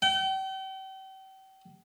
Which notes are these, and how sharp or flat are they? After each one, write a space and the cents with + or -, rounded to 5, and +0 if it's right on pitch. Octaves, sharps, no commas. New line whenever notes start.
G5 -40